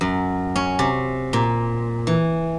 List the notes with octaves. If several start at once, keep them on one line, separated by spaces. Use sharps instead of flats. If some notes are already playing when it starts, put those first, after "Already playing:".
F#2
C#4
C3
A#2
E3